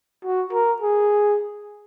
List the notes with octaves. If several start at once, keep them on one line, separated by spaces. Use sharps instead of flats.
F#4
A#4
G#4